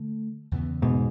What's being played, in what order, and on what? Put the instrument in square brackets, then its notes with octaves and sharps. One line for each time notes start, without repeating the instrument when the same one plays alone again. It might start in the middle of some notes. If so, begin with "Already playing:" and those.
Already playing: [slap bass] D3 A3
E2 C#3 E3 B3
[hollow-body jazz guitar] G#2 B2